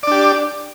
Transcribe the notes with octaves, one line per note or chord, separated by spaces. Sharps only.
D4 G4 D5